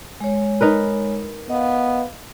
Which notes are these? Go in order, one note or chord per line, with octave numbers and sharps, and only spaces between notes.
G#3 C#5
D#4 A#4 B4
B3 D#5 F5